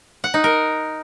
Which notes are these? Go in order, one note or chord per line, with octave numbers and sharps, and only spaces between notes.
F#5
D#4
A#4